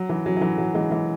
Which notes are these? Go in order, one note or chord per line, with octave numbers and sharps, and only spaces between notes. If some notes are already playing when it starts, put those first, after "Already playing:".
Already playing: F#3
E3
F#3
F#3
E3
F#3
E3 G#3
E3 G#3